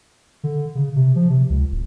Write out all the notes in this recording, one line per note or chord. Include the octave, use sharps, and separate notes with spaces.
D3
C#3
C3
F3
C3
C#2
D1